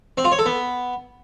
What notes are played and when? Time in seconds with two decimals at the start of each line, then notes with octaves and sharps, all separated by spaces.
0.18 C4
0.25 F4
0.32 C#5
0.39 A4
0.46 B3